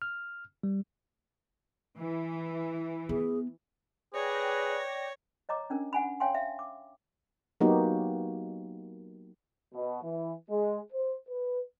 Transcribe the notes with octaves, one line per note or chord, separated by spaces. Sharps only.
F6
G3
E3
B3 G#4
G#4 B4 C#5 D5 G5 A#6
C#5 D#5 A#5 D6
C#4 D4 A#4
F#5 G#5 B5
C#5 F5 G5 G#5 C6
E5 F5
D6
F#3 A#3 B3 D#4 F#4 G4
B2
E3
G#3
C5
B4